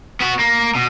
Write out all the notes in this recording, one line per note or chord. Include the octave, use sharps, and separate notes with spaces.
B3 F#4
A#3
B2